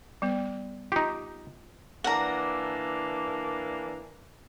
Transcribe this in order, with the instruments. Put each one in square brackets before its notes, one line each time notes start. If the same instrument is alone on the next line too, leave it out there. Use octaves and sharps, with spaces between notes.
[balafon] G3 B3
[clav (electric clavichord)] D#4 G4 [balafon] F4
[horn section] E3 A#3 D4 [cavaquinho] F#5 A#5